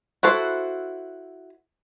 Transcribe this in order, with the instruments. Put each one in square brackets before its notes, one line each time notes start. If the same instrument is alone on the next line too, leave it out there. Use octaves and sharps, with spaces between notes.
[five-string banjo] E4 F#4 A4 C5